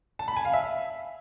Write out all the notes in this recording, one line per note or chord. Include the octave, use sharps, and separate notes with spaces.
A5
B5
G#5
F5
E5